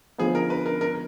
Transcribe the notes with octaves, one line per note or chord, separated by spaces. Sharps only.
D2 D3 F3 B3 D#4 G#4
A#4
B4
A#4
A#4